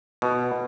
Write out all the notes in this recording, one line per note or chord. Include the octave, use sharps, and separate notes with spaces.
B2